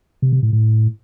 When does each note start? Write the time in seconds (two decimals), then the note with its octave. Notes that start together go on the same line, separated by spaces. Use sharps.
0.22 C3
0.33 C3
0.43 A2
0.53 A2